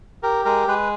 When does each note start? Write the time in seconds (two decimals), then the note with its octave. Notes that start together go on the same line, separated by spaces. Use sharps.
0.23 G4 A#4
0.45 G#3 A#4
0.67 G#3 B4